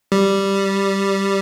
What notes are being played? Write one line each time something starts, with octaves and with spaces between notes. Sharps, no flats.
G3